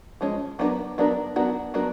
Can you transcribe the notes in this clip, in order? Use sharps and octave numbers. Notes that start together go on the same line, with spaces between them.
F3 G#3 C#4
F#3 B3 D4 F#4 A#4
F#3 B3 D4 F#4 A#4
F#3 B3 D4 F#4 A#4
F#3 B3 D4 F#4 A#4